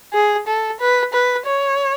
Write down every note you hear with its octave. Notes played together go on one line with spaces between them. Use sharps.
G#4
A4
B4
B4
C#5